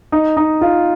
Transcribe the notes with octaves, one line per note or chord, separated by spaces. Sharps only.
D#4
D#4
F4